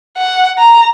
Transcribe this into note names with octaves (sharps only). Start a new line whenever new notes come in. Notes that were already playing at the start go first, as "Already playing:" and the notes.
F#5
A#5